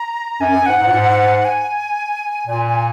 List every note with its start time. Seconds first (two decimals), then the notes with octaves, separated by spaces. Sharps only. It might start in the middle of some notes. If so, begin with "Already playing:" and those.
Already playing: A#5
0.40 F#2 G#5
0.53 F#2
0.66 G#2 F#5
0.80 G#2
0.86 A#2
0.92 G#2
1.45 G#5
2.47 A#2 G#5
2.66 G#5